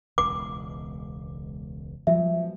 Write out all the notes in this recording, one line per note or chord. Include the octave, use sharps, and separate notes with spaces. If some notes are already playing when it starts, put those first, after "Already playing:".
E1 C#2 B2 D6
F3 F#3 G#3 B3 E5